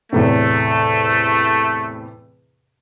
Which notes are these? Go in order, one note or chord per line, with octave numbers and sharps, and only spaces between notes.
E2 A2 C3 A3